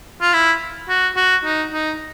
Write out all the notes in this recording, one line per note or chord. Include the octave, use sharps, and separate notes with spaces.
F4
E4
F#4
F#4
D#4
D#4